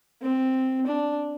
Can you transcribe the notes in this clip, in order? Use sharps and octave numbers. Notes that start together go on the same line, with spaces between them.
C4
D4